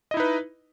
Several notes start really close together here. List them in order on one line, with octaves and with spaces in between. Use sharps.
D#5 E4 D#4 B4